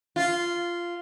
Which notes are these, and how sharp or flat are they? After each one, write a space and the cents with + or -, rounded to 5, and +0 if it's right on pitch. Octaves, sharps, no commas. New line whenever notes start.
F4 -10